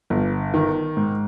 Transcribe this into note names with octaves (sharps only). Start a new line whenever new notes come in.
G1
D#3
G#2